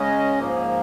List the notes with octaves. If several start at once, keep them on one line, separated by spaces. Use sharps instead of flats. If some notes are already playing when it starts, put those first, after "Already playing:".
Already playing: C#3 G#3 C#4 D#5
G#2 F3 A#3